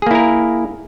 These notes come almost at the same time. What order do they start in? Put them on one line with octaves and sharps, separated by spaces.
G#4 A#3 E4 A#4